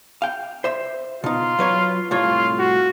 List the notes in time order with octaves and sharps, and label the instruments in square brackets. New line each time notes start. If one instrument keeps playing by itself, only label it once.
[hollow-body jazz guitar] F5 G5
C5 E5
[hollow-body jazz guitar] B2 D#4 [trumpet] F4
[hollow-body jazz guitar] F#3 B4 C#5
[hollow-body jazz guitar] C2 A2 C#5 [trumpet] F4
[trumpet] F#4